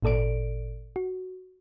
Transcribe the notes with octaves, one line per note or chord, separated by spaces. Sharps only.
G#1 A#2 A4 D5 D7
F#4